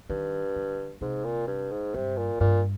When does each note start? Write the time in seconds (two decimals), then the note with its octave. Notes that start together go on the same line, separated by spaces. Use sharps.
0.09 G2 D#3
0.56 D3
1.01 G#2 C3
1.25 A#2
1.47 G2
1.71 G#2
1.94 G2 C3
2.17 A#2
2.40 G2 A#2